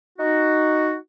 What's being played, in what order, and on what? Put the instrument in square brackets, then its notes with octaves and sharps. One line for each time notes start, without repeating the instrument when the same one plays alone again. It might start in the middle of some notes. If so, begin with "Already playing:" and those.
[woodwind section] D#4 F#4